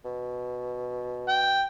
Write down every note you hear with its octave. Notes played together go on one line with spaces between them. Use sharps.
B2
G5